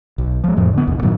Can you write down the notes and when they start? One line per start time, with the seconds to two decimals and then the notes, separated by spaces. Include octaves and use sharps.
0.18 B1
0.44 F3 G#3
0.57 F2 A2 F3
0.74 D3 B3
0.87 A1 D#2 B2
1.03 G2 A#2 D#3 F#3